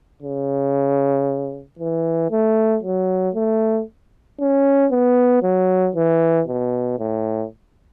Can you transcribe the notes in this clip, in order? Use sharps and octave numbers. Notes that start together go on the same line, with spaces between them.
C#3
E3
A3
F#3
A3
C#4
B3
F#3
E3
B2
A2